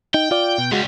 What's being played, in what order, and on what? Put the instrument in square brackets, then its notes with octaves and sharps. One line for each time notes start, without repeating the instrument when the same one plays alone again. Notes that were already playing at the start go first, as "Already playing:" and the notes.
[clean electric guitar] D#4 [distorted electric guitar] G5
[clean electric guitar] F4 D5
B2
[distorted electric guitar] C#2 G3 [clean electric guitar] G#3 F#4